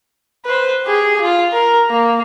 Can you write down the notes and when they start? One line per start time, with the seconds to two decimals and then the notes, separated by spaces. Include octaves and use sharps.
0.45 B4 C5
0.86 G4 G#4
1.21 F4
1.52 A#4
1.90 A#3